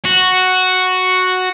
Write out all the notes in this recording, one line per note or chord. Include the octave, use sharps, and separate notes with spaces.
F#4